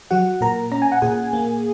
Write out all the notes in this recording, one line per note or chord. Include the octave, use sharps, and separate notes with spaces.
F#3 F#4 F#5
A#2 A#4 A#5
C#4 A#5
G#5
F#5
A#2 G#4 G#5
A#3